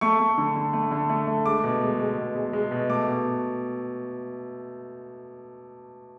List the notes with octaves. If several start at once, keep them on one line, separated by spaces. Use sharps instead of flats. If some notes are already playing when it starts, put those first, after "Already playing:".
A3 C#6
A3
D3
D3
A3
D3
A3
A3
G#3 D6
B2
G#3
G#3
B2
G#3
G#3
B2
A3 D6
B2